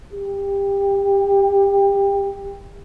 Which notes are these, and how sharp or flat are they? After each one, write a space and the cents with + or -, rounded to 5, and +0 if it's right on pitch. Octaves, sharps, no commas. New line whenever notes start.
G4 +20